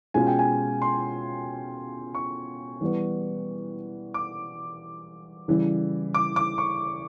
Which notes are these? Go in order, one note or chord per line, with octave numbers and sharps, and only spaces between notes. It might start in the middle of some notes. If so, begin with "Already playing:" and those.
B2 G#3 C#4 F4 G#5
G5
G#5
C6
C#6
E3 G3 B3
D6
C#3 E3 G3
D6
D6
C#6